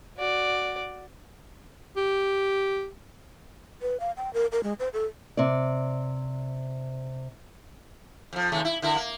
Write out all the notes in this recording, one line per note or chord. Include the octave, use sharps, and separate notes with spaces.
F#4 D5
G4
B4
F5
G5
A#4
A#4
G#3
C5
A4
C3 D5
F2 F3
D#2 C#3 A3
E4
D3 E4 A#4
A#3